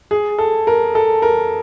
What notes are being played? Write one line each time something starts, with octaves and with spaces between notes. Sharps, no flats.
G#4
A4
A#4
A4
A#4